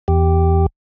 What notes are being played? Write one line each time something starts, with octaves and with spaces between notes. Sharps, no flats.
E2 G4